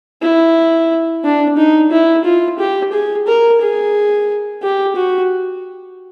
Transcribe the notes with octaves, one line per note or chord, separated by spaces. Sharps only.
E4
D4
D#4
E4
F4
G4
G#4
A#4
G#4
G4
F#4